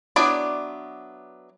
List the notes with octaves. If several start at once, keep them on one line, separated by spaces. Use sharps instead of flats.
F#3 B3 D4 E4 D5